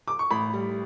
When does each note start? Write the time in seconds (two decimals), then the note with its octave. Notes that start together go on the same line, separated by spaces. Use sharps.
0.08 D6
0.19 C#6
0.31 A1 B5
0.54 G3